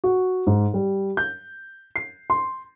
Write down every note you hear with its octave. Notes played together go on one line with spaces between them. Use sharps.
F#4
G#2
G3
G6
C7
C6